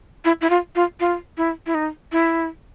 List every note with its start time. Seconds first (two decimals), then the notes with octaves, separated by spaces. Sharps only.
0.25 E4
0.41 E4
0.50 F4
0.75 F4
1.00 F4
1.37 E4
1.66 E4
1.74 D#4
2.12 E4